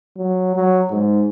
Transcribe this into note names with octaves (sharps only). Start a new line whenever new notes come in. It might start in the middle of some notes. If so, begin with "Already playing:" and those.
F#3
F#3
G#2